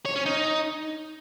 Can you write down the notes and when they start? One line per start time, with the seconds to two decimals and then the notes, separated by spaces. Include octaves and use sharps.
0.06 C#5
0.16 C#4
0.26 D#4